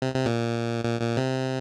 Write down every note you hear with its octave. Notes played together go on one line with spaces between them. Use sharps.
C3
C3
A#2
A#2
A#2
C3